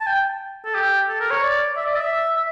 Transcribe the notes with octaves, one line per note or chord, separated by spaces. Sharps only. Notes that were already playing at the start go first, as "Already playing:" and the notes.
A5
G5
A4
G4
A4
A#4
C#5
D5
E5
D5
E5
E5